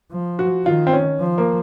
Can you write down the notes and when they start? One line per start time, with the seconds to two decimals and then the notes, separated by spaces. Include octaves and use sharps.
0.12 F3
0.39 F#4
0.65 D#3 F4
0.87 C4
0.93 C#4
1.20 F3
1.38 A#3